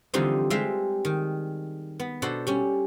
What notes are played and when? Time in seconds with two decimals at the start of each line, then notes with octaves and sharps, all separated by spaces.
0.14 D3 E3 F3 G3 C4 D#4
0.50 G3 G#3 C4 E5 F5 G5
1.05 D#3
2.00 B3
2.22 B2 D4 A4 C5 F#5
2.47 G3 C#4